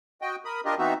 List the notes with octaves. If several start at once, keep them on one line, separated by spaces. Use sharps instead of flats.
F#4 D#5 G5
A#4 B5 D#6
D4 F4 G4 A#4 D#5
E3 B3 C4 D#4 F#4 E5